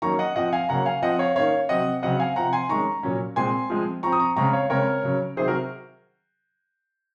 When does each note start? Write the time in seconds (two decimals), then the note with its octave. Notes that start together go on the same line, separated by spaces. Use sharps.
0.02 D#3 F#3 A#3 C#4 A#5 C#6
0.19 D#5 F#5
0.36 F3 C4 D#5 F#5
0.53 F5 G#5
0.69 C#3 F#3 A#3 C#4 F#5 A#5
0.86 F5 G#5
1.02 F3 C4 D#5 F#5
1.19 C#5 F5
1.36 D#3 A#3 C#4 C#5 F5
1.69 C3 F#3 C4 D#5 F#5
2.03 C#3 F#3 C4 D#5 F#5
2.19 F5 G#5
2.36 C3 F3 C4 F#5 A#5
2.53 G#5 C6
2.69 D#3 G#3 C#4 A#5 C#6
3.03 A#2 F#3 C#4
3.36 A#2 G#3 C4 G#5 C6
3.70 F3 G#3 C4
4.03 F3 C4 A#5 C#6
4.12 D#6
4.20 A#5 C#6
4.36 C#3 G#3 C4 A#5 C#6
4.53 C#5 F5
4.70 C#3 G#3 C4 A#4 C#5
5.03 C#3 F#3 C#4
5.36 C3 D#3 F#3 G#4 C5
5.48 F#4 A#4